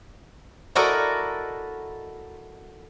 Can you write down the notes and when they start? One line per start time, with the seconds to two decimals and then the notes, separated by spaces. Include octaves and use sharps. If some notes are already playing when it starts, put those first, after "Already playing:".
0.75 E4 F#4 A4 A#4 D5 D#5